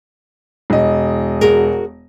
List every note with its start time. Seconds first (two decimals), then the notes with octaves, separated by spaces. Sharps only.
0.70 E1 D#5
1.41 F#4 G#4 A#4